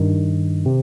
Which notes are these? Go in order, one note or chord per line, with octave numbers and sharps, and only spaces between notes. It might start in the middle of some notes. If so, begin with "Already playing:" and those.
Already playing: G2 D#3
C3